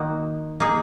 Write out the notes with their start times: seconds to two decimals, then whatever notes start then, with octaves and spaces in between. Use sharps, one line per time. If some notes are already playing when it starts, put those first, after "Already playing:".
Already playing: D#3 A#3 D#4 F#4
0.60 A#3 D#4 G#4